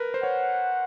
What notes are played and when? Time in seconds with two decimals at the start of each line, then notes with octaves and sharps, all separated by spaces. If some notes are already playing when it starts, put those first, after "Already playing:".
Already playing: A#4 B4
0.14 C5
0.23 C#5 F#5